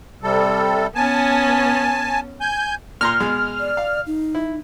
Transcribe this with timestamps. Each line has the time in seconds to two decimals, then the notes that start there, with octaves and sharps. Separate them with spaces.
0.23 C3 G3 A4
0.95 B3 C#4 G#5 A5
2.41 G#5 G6
3.01 A#2 A#5 C6 F6
3.20 B2 G#3
3.60 D5
3.77 F5
4.07 D#4
4.35 E4